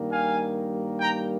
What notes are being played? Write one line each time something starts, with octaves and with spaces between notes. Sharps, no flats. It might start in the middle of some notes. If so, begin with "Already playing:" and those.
Already playing: G2 D#3 G3 A#3
F5 G#5
G5 A#5